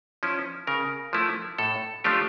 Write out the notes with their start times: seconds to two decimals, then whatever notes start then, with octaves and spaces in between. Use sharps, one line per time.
0.23 F3 C#4 E4
0.67 C#3 A#4
1.13 F3 A3 E4
1.58 A2 A4
2.04 F3 A3 D4 F4 G4